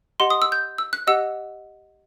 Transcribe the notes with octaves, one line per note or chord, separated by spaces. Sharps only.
G4 D#5 F#5 C6
D#6
E6
G6
E6
F#6
G4 D#5 F#5 E6